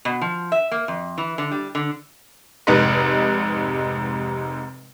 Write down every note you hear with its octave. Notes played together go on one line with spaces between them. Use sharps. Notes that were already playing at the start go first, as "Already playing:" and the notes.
B2
F3
E5
A#3
F2
E3
D3
G3
D3
F1 G#2 C3 D#4 B4